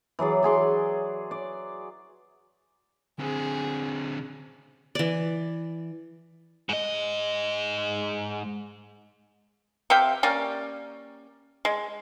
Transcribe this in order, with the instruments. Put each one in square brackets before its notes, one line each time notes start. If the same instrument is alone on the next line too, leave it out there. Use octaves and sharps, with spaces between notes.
[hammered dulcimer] E3 F#3 G#4 D5
F#3 G#4 C6 D6
D5
[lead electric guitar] D3 C4 [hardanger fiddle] G#4
[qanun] E3 D5
[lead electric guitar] G#2 D#5
[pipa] C3 E5 F5 G5
A#3 C#4 G4 D5
G#3